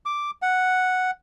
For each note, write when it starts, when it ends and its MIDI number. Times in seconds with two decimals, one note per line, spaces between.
0.06 0.31 86
0.42 1.11 78